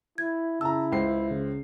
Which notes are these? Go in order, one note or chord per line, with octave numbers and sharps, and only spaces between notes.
E4 G#6
C#3 E4 A5 A#5 E6
C#2 C5 C7
C#3